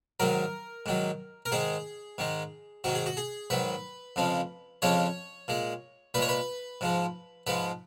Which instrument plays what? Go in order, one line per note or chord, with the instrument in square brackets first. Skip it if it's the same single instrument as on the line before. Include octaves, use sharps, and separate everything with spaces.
[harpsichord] G#2 D#3 F#3 A#4
G#2 D#3 F#3
A#4
G#2 D#3 G#3 G#4
G#2 D#3 G#3
G#2 D#3 F#3 F#4
G#4
F#4
G#4
G#2 D#3 F#3 B4
F2 C#3 F3 G#3
F2 C#3 F3 G#3 C#5
A#2 G#3
A#2 B4
G#3 C#5
B4
G#2 F3 G#3
G#2 F3 G#3 B4